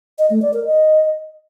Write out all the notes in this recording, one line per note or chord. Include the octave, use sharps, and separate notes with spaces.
D#5
A3
D5
A#4
D#5